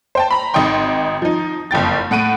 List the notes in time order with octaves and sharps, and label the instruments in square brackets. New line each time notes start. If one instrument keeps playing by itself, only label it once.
[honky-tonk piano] C5 G5 A5
A#5 B5
G#1 D#4 D#5 G5 C6
F3 D#4
F#1 F2 G5 A6
A2 F#5 D7 D#7